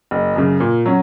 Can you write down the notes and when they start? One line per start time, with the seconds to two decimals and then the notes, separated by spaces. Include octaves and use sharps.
0.11 F#1
0.36 F#2 C#3
0.60 A#2
0.86 F#3 C#4